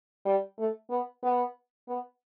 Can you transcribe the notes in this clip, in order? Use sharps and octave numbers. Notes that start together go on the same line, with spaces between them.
G3
A3
B3
B3
B3